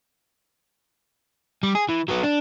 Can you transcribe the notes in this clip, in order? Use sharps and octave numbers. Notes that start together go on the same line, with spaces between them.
G3
G#4
E3
F#3 B3
D4